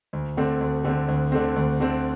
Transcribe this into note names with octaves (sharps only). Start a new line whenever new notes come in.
D2
D3 A3 C4
D2
D3 A3 C4
D2
D3 A3 C4
D2
D3 A3 C4